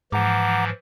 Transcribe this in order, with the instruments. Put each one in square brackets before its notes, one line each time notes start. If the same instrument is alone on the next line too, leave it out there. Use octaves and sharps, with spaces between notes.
[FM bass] G#2 [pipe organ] E3 F3 [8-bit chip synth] F#5 A#5 D6